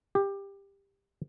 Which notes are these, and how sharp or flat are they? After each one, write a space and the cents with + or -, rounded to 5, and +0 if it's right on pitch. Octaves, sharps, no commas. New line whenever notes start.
G4 +15